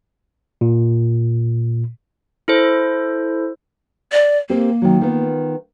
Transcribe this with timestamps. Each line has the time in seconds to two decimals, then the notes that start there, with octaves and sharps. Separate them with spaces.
0.61 A#2
2.48 E4 A4 C5
4.12 D5
4.50 A#3 C4 G4 A#4
4.82 D#3 F#3
5.02 D#3 B3 F4